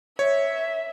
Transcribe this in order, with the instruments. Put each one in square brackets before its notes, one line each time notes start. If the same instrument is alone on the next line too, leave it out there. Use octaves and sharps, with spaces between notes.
[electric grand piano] C#5 [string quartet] E5